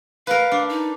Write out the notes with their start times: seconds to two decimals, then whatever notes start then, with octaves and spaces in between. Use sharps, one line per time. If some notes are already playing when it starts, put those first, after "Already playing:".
0.27 A#4 B4 F5
0.52 D4
0.69 D#4